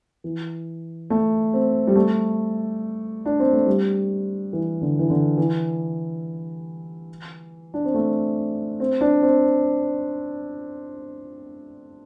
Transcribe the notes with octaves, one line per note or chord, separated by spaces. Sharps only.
E3
A3
C4
G3
A3
D4
C4
A3
G3
E3
D3
E3
D3
E3
D4
C4
A3
C4
D4
C4